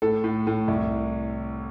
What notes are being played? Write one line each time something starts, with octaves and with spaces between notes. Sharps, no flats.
A2 A4
A2
A2
C2